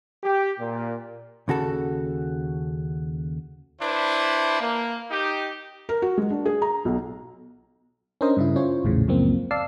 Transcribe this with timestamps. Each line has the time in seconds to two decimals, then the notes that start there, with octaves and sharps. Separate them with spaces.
0.24 G4
0.60 A#2
1.48 D#2 C#3 F#4 A4
3.80 D4 E4 B4 C5
4.60 A#3
5.11 D#4 G4
5.89 A#4
6.02 F#4
6.18 G#3
6.30 D4
6.45 G#4
6.62 A#5
6.85 B1
8.21 C#4 D4 A#4 C5 D#5
8.37 G2 C#3 E4
8.56 C#4 F4 C5 C#5
8.84 A#1 E2 A2 C#3
9.08 C#2 F#2 F3 A#3 C4
9.51 D5 F5 A5 E6 C7